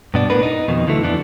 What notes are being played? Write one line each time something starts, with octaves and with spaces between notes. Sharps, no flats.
G2 B2 D4
A2 B3 D4 A#4 B4
D#4
F2 B2 D#3
D2 D3 E3 F#3 A3
F2 E3 B3 D4